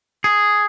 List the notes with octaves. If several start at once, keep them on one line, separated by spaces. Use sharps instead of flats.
G#4